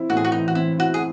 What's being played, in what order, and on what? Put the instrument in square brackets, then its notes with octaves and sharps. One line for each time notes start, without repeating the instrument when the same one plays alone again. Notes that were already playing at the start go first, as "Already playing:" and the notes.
Already playing: [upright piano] C4 E4
[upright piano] A2 [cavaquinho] F#4
[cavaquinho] G#4
F#4
[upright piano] E3 [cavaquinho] D#4
[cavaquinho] F#4
[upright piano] C4 [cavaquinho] E4
[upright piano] E4 [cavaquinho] F#4
[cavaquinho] G#4